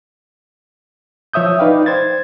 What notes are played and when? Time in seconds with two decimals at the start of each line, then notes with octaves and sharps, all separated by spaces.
1.33 F3 C#5 E5 D#6 G6
1.59 D#4 B4 D5 F5 G5
1.86 C5 G#6 A6